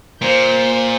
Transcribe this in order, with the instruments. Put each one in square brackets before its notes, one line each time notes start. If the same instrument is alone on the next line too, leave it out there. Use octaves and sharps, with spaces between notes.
[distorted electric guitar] A#2 [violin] C5 G6